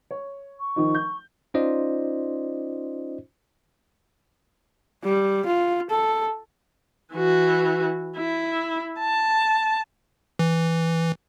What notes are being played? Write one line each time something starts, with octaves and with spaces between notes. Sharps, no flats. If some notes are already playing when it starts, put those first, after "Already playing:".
C#5
C#6
D#3 F3 D#4
G6
C#4 D#4 F4 C5 D5 D#5
G3
F4
A4
E3 F#4
E4
A5
E3